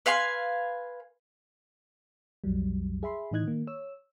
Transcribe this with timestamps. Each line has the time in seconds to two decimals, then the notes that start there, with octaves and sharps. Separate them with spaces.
0.06 B4 F5 G#5 C6
2.44 B1 F2 F#3 G3
3.03 G#4 E5 B5 C6
3.31 A2 E3 D#4 D#5 F#6 G#6
3.44 D#3 A#3
3.67 C#5 E6